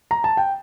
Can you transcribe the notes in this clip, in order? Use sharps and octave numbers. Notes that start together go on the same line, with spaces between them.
A#5
A5
G5